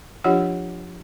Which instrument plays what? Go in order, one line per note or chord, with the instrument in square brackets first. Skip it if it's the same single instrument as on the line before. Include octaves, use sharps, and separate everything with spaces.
[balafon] F3 D4 F4 G4 C#5 F#5